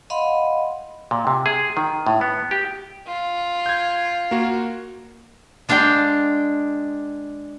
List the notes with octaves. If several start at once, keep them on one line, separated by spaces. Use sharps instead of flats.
D#5 F5 F#5 B5 C6
A#2
C3
G#4
D#3
A2
B3
G4
F4
G6 G#6
A#3 F#4
G#3 D4 F5 G5 C6